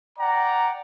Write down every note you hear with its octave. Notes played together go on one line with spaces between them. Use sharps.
D5 F#5 G5 A#5